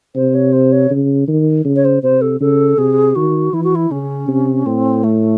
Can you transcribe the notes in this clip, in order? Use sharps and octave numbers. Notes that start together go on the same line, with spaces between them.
C3 C5
C#5
C5
C#5
C#3
D#3
C#3
C#5
C5
C3 C5
A4
C#3 A4
C3 G#4
D#3 F#4
E3 E4
F#4
E4
C#3 C#4
C3
A2 C4
A3